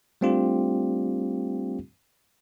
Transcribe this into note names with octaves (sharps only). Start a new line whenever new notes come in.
G3 A3 C4 D4 F4 G4